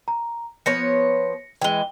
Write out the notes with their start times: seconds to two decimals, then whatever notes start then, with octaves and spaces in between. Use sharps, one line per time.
0.08 A#5
0.66 F3 B3 C#5 A#6 C#7
1.62 E3 G#3 G5 G7